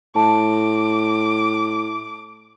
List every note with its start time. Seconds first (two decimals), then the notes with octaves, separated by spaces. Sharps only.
0.16 A2 A5 D6